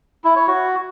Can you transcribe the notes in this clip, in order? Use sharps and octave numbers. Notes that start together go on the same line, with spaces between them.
E4
C#5
F#4